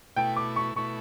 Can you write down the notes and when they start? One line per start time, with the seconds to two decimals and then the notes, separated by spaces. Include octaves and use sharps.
0.16 B2 A3 E4 G5
0.36 D6
0.56 C#6
0.76 B2 A3 E4 C#6